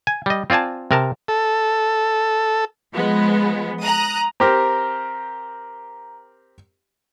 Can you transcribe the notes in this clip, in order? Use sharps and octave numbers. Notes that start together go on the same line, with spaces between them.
G#5
G3 D#5
C4 F4 D5 G#5 A5
C3 A#4 A5
A4
F3 G#3 B3
A#5 D#6 F#6
C4 G4 A#4 A#5